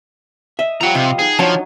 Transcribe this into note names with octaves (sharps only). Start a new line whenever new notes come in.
D#5 E5
F3 G3 F#5 A#5
C3 D#5 F5
D#4 G#4 F#5
F3 F#3 D4 C#5 G#5 A5